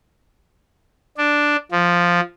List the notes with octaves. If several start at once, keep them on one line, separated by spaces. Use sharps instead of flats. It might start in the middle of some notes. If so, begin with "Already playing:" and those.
D4
F3